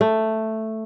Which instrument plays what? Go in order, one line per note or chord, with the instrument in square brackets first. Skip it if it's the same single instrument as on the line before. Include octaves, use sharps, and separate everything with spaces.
[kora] A3